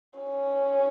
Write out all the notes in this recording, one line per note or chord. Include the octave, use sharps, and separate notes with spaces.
C#4